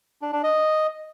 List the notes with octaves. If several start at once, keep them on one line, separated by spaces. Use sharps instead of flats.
D4
D4
D#5